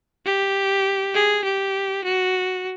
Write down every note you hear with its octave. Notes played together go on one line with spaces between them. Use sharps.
G4
G#4
G4
F#4